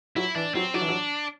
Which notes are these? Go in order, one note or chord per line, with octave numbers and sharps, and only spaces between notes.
F#3 E4
E3 D4
F#3 C4
F#3 D4
E3
F#3